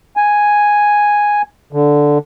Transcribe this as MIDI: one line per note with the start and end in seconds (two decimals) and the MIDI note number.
0.17 1.42 80
1.73 2.18 50